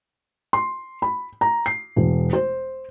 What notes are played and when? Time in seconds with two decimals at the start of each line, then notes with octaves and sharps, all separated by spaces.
0.53 C6
1.02 B5
1.41 A#5
1.66 C7
1.96 E1
2.33 C5